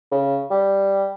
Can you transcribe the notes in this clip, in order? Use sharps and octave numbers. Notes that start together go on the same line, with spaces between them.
C#3
G3